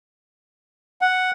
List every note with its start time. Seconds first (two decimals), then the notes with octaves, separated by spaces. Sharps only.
1.01 F#5